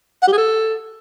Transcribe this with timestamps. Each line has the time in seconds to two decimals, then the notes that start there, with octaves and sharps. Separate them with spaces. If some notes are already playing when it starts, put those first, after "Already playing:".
0.22 F#5
0.27 G4
0.33 G#4
0.38 A4